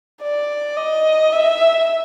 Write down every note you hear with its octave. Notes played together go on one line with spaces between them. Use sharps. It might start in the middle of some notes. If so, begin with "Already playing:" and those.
D5
D#5
E5